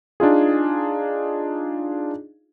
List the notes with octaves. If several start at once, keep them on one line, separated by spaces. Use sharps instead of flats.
D4 D#4 F4 G#4